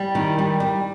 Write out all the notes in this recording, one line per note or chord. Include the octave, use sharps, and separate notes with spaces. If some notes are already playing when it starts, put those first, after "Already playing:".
Already playing: G3
D#3
G3
G3